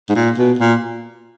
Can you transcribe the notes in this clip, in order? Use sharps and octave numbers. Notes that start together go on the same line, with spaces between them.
G#2
A#2
B2
A#2